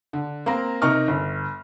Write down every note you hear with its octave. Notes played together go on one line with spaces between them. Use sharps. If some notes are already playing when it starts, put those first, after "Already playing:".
D3
A#3 C4 F5 A#5
C3 D#4 A#4 C#6 F6
G1